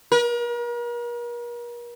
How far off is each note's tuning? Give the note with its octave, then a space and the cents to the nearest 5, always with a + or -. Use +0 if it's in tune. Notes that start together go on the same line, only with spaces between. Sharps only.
A#4 +40